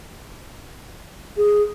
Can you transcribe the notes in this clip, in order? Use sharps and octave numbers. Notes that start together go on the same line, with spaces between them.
G#4